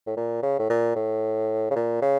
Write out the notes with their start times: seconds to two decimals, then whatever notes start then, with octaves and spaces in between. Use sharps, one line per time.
0.07 A2
0.17 A#2
0.43 C#3
0.59 A2
0.70 A#2
0.96 A2
1.71 C#3
1.76 A#2
2.02 C#3